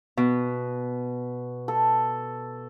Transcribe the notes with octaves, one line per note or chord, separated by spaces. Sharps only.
B2
A4